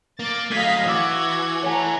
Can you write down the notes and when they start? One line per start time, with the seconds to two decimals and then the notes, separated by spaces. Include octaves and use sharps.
0.19 A#3 D6 A6
0.50 F#3 A3 D#5 F5 G#6 B6 C7 D#7
0.86 E3 F#4 D6 E6 G#6 A6
1.63 A3 C#5 F#5 G#5 A#5